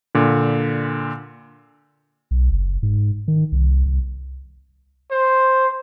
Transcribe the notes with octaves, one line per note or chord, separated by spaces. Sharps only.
A#2 D3
B1
F#1
G#2
D#3
C2
C2
C5